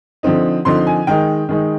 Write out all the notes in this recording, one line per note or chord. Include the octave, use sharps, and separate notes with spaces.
D3 F3 C4 D#4
D3 F3 C4 D#4 C6
G#5
D#3 G#3 D#4 G5
D#3 G#3 D#4